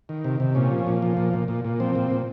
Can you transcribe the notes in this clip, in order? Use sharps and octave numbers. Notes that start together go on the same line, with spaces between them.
D#3
C3
C3
A#2 C#4
F3
A#2
F3
A#2
A#2
A#2
A#2
F3 C4
A#2
A#2